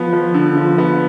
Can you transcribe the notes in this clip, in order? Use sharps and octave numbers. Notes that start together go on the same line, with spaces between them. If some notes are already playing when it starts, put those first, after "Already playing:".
Already playing: F3 B3
F3
D3
F3
B3